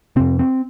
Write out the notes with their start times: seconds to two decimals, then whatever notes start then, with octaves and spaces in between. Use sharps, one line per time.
0.16 F2 C3 C4
0.39 C4